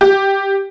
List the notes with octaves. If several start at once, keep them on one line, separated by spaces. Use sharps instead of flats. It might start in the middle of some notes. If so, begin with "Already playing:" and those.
G4